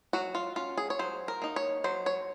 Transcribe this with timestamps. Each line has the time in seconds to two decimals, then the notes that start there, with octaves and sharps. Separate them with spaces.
0.13 F#3 F#4
0.35 F4
0.56 C#4 F4
0.77 G#4
0.90 C#5
0.99 F#3 C5
1.28 A#4
1.42 A#3 D#4
1.56 C#5
1.84 F#3 C5
2.06 C#5